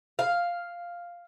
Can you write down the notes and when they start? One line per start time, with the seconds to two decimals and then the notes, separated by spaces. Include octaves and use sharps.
0.19 F5